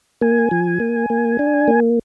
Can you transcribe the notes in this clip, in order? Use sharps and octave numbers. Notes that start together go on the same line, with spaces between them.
A#3 G#5
F3
A#3
A#3
D4
A#3